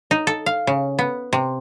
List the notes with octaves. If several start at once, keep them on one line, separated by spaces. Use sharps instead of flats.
D#4
A4
F5
C#3
B3
C3